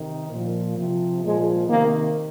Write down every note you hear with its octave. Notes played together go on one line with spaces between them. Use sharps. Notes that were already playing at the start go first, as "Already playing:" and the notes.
Already playing: C3 D#3
A#2 F3
C3 F3
A#2 F3 G#3
C3 D#3 A#3